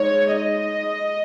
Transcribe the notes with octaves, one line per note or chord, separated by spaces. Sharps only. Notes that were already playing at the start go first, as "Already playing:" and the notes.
Already playing: G#3 D#4 C#5
D#5